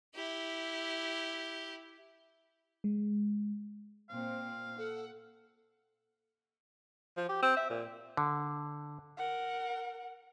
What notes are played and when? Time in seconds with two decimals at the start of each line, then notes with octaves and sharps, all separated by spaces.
0.15 E4 G4
2.84 G#3
4.10 A#2 C4 F5
4.78 A4 F#5
7.17 F3
7.29 G4
7.43 C4
7.57 E5
7.70 A#2
8.17 D3
9.17 A#4 F#5